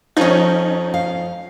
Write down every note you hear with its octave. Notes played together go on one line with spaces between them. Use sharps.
F2 C#4 D#4
F5